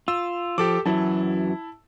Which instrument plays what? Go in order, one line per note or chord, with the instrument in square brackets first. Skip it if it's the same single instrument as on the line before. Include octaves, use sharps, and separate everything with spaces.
[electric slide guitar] F4 [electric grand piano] E6
[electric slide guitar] F3 [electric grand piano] G4 A4 D6
[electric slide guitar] F#2 E3 F#3 [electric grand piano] E4 A5